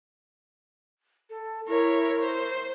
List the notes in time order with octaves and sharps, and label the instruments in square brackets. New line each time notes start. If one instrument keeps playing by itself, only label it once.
[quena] A4
[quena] E4 [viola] A#4 C#5
[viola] C5